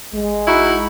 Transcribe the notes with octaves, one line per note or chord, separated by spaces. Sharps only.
A1 G#3
D#4 E4 F#4